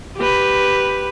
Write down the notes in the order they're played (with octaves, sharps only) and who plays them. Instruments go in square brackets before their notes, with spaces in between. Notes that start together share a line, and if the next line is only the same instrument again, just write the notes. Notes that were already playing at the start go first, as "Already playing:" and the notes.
[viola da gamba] G4 B4